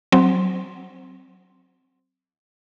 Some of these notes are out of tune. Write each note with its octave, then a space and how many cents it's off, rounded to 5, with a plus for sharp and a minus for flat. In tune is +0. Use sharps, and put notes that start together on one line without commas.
F#3 +5 C4 +0